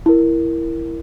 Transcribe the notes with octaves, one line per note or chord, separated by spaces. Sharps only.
E4 A#4